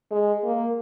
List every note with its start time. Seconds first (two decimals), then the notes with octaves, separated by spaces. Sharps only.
0.11 G#3
0.44 A#3